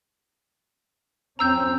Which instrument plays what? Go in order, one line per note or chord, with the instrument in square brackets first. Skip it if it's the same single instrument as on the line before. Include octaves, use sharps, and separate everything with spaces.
[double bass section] F2 C4 C#4 [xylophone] A#5 E6 G6